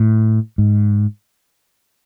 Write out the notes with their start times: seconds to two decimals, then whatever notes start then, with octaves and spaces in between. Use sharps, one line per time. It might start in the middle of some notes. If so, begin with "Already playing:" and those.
Already playing: A2
0.58 G#2